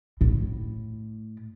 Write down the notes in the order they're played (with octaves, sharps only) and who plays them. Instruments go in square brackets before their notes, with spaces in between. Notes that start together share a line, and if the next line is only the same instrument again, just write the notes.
[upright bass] A2